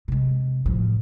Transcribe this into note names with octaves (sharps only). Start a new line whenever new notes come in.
C3 G#3
A2 F3